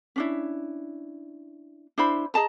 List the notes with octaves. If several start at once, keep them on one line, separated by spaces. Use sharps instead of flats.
C#4 D4 E4
D4 E4 C5 B5
G#4 D#5 A5 A#5